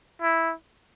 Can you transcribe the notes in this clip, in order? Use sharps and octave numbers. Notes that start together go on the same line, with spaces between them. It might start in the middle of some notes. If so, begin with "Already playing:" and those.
E4